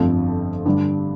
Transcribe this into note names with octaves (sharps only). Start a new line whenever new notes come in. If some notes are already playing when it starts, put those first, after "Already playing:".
Already playing: G1 F2 F3 A3 C4
G2 D3 G3 D4